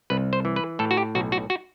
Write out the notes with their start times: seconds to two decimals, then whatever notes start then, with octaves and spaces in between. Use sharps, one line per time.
0.10 C2 B4
0.33 C5
0.45 E3
0.56 B4
0.79 A2 A4
0.91 F#4
0.97 G4
1.15 B1 F#4
1.32 F#4
1.50 F#4